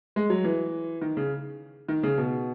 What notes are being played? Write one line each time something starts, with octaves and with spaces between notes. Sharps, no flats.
G#3
F#3
E3
D#3
C#3
D#3
C#3
B2